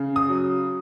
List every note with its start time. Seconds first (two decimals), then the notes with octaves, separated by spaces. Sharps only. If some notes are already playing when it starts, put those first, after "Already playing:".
Already playing: C#3
0.16 D#6
0.29 F#3